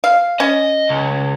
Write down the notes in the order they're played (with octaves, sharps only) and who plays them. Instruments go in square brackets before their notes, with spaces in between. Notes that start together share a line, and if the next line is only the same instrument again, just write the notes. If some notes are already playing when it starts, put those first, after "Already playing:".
[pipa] F5
[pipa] C#4 [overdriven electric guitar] D#5
[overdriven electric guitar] C#2